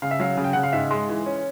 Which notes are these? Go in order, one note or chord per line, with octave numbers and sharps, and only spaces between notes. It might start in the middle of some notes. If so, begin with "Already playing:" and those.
C#3 F5
E5
F#3 F5
C#3
G5
C#3 F#5
F5
G#2 E5
G#3
E3
C#4